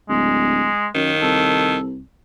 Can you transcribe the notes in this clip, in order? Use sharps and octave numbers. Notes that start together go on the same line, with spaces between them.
D1 G#3
F#2 D#3
C2 A4